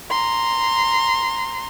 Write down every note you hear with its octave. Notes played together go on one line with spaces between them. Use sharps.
A#5 C6